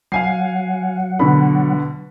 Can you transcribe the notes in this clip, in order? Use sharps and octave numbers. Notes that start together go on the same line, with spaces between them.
F#3 F5 F#5 G#5 C7
B2 D3 B5